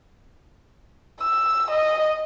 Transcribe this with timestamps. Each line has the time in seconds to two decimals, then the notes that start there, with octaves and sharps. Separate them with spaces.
1.20 E6
1.71 D#5